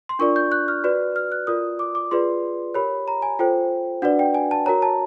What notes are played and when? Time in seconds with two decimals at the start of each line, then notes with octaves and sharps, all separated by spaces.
0.09 C6
0.19 D4 F4 A#4 D5 C#6
0.36 G6
0.52 F#6
0.68 F6
0.84 F#4 B4 D5
1.16 F6
1.32 F#6
1.47 F4 A#4 D5 D#6
1.79 D6
1.95 D6
2.11 F4 G#4 B4 D5 C6
2.74 G4 A#4 C#5 B5
3.08 A#5
3.22 G#5
3.39 F4 A4 C5 G5
4.02 D4 F#4 B4 D5 F#5
4.19 G5
4.34 G#5
4.51 A5
4.66 F#4 A#4 C#5 A#5
4.82 A5